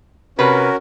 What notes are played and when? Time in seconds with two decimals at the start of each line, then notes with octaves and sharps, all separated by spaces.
0.39 C3 C#4 F#4 A#4 B4